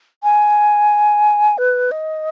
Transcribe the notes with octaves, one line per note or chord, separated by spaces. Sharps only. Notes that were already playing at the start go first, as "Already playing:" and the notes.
G#5
B4
D#5